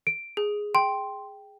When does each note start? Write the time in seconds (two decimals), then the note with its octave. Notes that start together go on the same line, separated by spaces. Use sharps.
0.07 D7
0.37 G#4
0.75 G5 C6